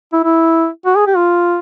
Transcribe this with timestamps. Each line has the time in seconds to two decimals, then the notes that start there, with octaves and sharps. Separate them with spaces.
0.13 E4
0.24 E4
0.86 F#4
0.96 G#4
1.07 G4
1.16 F4